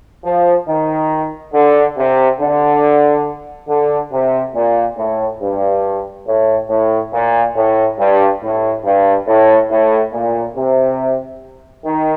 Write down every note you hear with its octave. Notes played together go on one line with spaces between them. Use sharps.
F3
D#3
D3
C3
D3
D3
C3
A#2
A2
G2
A2
A2
A#2
A2
G2
A2
G2
A2
A2
A#2
C3
D#3